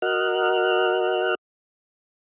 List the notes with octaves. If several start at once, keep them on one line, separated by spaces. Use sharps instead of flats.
F#4 A#4 D#5 F6 F#6